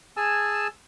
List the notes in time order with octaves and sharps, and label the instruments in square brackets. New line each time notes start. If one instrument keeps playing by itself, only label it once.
[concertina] G#4 G#5 A5 E6